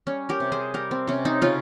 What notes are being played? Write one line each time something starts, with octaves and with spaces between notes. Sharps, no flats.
G3 C#4
G4 A#4
C3
G#4 C5
G3 G4 A#4
C4
C3 C#4
C4 D#4
C#3 C#4 F4